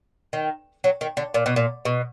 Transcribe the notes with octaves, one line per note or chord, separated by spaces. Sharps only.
D#3
F#3
D#3
D3
A#2
B2
A#2
B2